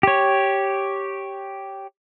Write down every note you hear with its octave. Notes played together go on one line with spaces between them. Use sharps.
G4 C#5